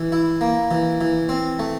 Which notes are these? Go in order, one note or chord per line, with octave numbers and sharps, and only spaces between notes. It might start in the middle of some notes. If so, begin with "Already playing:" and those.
Already playing: E3
E4
A#3
E3
E3
C4
A3